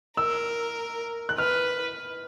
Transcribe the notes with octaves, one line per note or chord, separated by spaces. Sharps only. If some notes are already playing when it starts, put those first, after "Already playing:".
A#4 E6
F#6
B4 F6